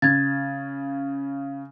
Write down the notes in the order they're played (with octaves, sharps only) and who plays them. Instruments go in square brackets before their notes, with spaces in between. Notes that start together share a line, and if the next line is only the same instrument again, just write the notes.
[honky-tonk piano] C#3 [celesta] G#6 A6